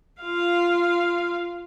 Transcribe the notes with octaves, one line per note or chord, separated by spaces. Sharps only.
F4 F5